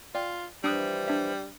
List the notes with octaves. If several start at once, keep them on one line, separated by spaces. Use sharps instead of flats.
F4 D5 G5
E3 F3 G3 D4 D#6 F#6
D4 E5